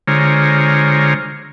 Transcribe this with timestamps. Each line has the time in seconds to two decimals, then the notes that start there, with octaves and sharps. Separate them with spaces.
0.08 D3 G#3 F4 C5 C#5 A#5